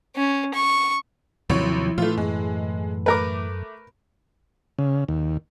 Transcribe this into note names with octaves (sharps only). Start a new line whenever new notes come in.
C#4
C#6
A1 D#2 C3 F3 F#3 E4 C#5
A2 E3 A3 F4
F#2 G#3
A3 A#4 B4 D6
C#3
D#2